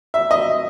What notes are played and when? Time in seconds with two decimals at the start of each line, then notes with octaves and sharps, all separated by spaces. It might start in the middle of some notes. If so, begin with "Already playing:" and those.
0.14 E5
0.31 D#5